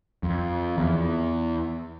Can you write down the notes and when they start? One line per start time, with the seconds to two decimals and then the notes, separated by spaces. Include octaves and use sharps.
0.23 F2
0.78 E2